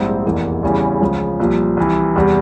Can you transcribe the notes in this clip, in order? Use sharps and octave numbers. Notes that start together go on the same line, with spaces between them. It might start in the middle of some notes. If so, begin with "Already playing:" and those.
Already playing: A#1 G#2 G3 C4 E4
F1 E2 E3 A#3
E2 C#3 E3 G3 C#4
C#2 C#3 F3
C2 A#2 F3
C2 C3 E3
E2 C3 G3